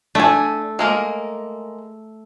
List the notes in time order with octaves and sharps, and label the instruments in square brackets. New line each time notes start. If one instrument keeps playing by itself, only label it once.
[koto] A3 [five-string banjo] D4 G#5
[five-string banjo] G#3 A#3 A#4